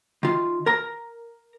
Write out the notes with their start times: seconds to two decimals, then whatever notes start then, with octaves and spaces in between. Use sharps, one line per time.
0.23 D#3 F4
0.66 A#4 A#5